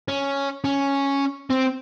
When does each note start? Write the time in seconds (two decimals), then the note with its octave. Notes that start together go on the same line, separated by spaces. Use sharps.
0.08 C#4
0.64 C#4
1.50 C4